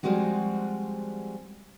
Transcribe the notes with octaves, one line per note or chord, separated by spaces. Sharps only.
F3 G3 G#3 C4 F#4 G#4